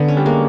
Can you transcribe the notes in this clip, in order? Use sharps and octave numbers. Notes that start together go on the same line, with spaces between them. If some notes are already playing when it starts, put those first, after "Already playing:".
Already playing: D3 B3
C#4
G3
G#3 A#3